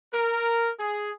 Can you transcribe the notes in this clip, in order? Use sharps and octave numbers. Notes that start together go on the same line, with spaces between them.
A#4
G#4